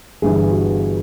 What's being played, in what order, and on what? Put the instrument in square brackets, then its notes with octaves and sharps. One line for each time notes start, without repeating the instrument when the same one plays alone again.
[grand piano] G1 G2 E3 [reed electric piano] G#4
[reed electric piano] F#4